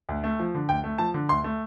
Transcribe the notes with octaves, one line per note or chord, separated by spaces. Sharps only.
D2
A3
F3
D3
D2 G5
A3
F3 A5
D3
D2 C6
A3